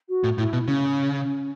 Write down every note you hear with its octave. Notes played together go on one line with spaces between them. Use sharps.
F#4
A2
A2 E4
B2
C#3 C#4